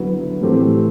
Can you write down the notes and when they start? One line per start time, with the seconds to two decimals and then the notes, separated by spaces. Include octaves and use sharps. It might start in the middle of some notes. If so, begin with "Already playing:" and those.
Already playing: D3 F#3 B3 E4 B4
0.41 A2 E3 A3 C4 G4